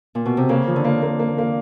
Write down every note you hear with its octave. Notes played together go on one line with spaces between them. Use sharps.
A#2
B2
C3
C#3 A#3
F3
D3
A#3
A#3
A#3
A#3